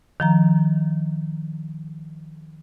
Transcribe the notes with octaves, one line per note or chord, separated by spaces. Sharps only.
D#3 F3 A#5